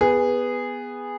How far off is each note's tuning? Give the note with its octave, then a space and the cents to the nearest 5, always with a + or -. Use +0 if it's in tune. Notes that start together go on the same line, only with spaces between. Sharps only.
B3 +0 G#4 -15